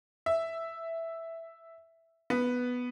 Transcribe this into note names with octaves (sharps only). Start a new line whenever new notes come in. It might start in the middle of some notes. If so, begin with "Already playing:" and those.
E5
B3